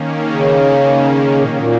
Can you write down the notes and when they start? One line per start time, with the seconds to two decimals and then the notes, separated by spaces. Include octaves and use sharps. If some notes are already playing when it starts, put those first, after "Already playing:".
Already playing: D#3 A#3 C#4
0.28 C#3
1.38 A#2 D#3 F#3 A#3
1.48 C#3
1.57 A#2